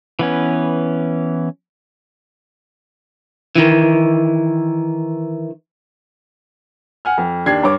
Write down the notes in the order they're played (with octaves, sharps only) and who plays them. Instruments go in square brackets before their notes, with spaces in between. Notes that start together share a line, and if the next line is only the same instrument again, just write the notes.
[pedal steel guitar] E3 B3 C#4
[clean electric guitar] D#3 E3
[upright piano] F#5 G#5 F6
F2
D#2 D4 G4 G#6 C7
G2 C#5 D6